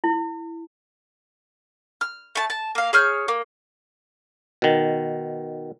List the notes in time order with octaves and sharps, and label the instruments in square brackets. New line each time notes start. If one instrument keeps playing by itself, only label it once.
[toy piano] E4
[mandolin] F6
A3 A5
A5
A#3 F5
G#4 C#5 F6 G6
A#3
[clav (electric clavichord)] B2 D#3